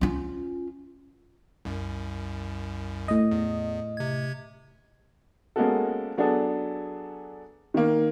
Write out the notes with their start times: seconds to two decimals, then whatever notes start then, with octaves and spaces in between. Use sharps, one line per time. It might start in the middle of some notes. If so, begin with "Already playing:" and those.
0.01 C#4 F4
1.65 C2 F#2
3.08 A2 D#5
3.32 E2
3.97 C3 G#6
5.56 G#3 A#3 B3 C#4 F#4 A4
6.17 F#3 B3 D4 G#4 A4
7.74 D#3 A#3